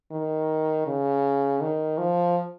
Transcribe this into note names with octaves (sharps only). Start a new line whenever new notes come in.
D#3
C#3
D#3
F3